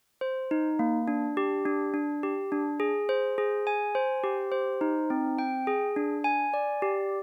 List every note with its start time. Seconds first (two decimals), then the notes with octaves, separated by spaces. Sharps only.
0.21 C5
0.51 D#4
0.79 A#3
1.08 D4
1.37 G4
1.66 D4
1.94 D4
2.23 G4
2.52 D4
2.80 G#4
3.09 C5
3.38 G#4
3.67 G#5
3.95 C5
4.24 G4
4.52 C5
4.81 D#4
5.10 C4
5.39 G5
5.67 G#4
5.96 D4
6.24 G#5
6.54 D5
6.82 G4